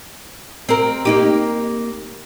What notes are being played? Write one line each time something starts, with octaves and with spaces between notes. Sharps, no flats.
C4 A#4
A#3 D#4 G4